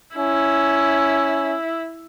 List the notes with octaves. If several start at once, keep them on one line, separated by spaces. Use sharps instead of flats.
C#4 E4